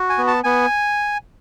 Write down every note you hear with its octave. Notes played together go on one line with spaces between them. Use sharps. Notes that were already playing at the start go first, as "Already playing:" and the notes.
Already playing: F#4
G#5
B3
A5
B3 G#5